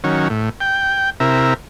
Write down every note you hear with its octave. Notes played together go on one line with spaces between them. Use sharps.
D#3 F#3 C#4
A2
G5
C3 E4 A#4